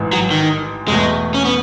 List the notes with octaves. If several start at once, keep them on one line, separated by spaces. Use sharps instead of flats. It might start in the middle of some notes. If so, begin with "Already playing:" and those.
Already playing: A1 G#2 E3 G#3
F#3
D#3
E1 E2 B2 G#3 A3
C#4
B3